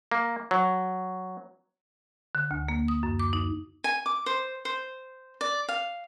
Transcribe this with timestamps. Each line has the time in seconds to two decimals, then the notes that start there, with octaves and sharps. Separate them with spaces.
0.12 A#3
0.51 F#3
2.35 D3
2.51 D2
2.68 A#3
2.88 D#6
3.03 F#2
3.19 D6
3.33 D#4
3.84 G#5
4.06 D6
4.26 C5
4.65 C5
5.41 D5
5.69 F5